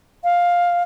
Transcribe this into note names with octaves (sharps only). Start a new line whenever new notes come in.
F5